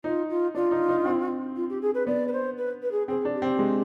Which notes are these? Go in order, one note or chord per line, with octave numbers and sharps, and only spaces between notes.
D#4 F4
F4
D4 F4
D#4
D#4
C4
F4
G4
G#4
B4
B3 D5
B4
C5
B4
B4
G#4
C4 G#4
D4
G4
C4
G#3